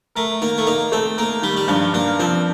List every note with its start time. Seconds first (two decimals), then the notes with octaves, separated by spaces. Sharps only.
0.15 A3 A#4
0.42 D#3 A#3
0.58 A3
0.67 A#3 D#4
0.92 A3 C4
1.18 A#3 A#4
1.42 D#3 G3
1.57 G3
1.68 G2 F3
1.93 G2 A#3
2.19 F3 C4